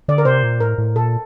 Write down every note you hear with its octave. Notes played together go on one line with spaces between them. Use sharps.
D3 D5
A#4
C3 C5
A#2
A2 A#4
A2
A#2 A4